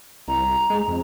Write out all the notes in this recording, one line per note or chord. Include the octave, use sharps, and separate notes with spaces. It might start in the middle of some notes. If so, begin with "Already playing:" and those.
C2 A#5
G#3
F2